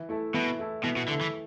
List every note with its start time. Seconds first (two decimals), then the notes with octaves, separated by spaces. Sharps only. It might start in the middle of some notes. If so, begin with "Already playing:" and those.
Already playing: E3
0.09 A3 E4 A4
0.34 B2 E3
0.59 A3 E4 A4
0.84 B2 E3
0.96 B2
1.08 D3 A3 E4 A4
1.21 E3